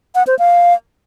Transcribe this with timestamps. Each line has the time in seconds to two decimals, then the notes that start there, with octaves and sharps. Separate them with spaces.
0.15 F#5
0.27 C5
0.39 F5